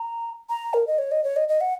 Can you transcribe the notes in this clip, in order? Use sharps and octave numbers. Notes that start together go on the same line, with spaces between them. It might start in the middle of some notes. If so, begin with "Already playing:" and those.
Already playing: A#5
A#5
A#4
D#5
C#5
D#5
C#5
D#5
D#5
F#5